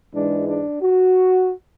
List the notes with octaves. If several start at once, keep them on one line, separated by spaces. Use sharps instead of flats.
G#2 E3 G#3 D4
D4
F#4